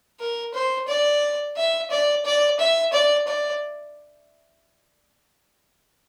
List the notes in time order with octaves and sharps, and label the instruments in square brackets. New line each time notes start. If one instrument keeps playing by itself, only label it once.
[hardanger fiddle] A#4
C5
D5
E5
D5
D5
E5
D5
D5